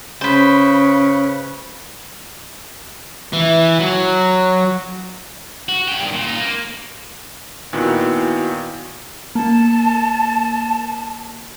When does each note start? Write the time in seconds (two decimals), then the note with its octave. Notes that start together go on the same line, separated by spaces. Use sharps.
0.21 C#3 B4 C5
3.33 E3
3.80 F#3
5.69 F#4
5.88 G2 G4
6.00 G2 D#3
6.13 A#2
6.27 D#4 F4
6.40 A#3
7.73 A#2 D#3 B3 E4 F#4
9.35 A#3 A5